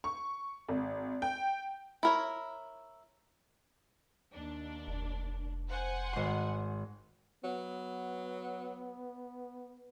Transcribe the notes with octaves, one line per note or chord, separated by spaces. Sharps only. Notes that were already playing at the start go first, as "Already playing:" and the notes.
C#6
G#1
G5
E4 A#4 C#5
D#2 D4
F1
C5 F#5 G#5
G#1 C6
F#3 B3